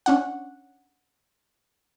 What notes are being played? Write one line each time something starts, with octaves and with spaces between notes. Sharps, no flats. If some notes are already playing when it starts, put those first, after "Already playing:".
C#4 D4 F#5